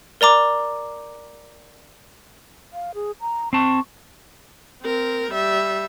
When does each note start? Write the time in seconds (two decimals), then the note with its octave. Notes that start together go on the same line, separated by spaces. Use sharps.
0.21 A#4 D5 A#5 D6
2.73 F5
2.95 G#4
3.21 A#5
3.53 C4 A5 C#6
4.82 C4 A#4
5.32 G3 E5